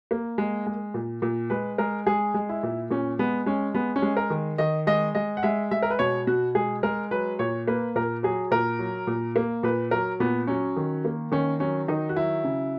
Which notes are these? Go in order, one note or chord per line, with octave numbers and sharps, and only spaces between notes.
A#3
G#3
G#3
A#2
A#2
G#3 B4
G#3 A#4
G#3 G#4
G#3
E4
A#2
A#2 C#4
G#3 B3
G#3 C#4
G#3 B3
C#4
G#3
A#4
D#3
D#3 D#5
G#3 D#5
G#3 D#5
F#5
G#3 E5
G#3 E5
A#4
B4
B2 C#5
B2 F#4
G#3 G#4
G#3 A#4
F#3 B4
A#2 C#5
A#3 B4
A#2 A#4
F#3 G#4
A#2 A#4
F#3
A#2
A#3
A#2 B4
F#3 A#4
A#2 B3
F#3 C#4
D#3
A#3
D#3 C#4
F#3 C#4
D#3 D#4
F#4
F#3 E4
C#3